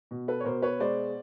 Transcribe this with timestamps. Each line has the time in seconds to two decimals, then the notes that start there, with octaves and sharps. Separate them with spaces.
0.11 B2
0.28 A4 B4
0.40 C#5
0.45 B2 A#4 C5
0.62 B4 C#5
0.80 G#3 C5 D5